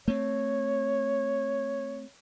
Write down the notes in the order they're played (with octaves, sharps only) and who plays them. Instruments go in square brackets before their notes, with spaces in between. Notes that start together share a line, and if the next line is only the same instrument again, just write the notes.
[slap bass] A3 C4 [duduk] C#5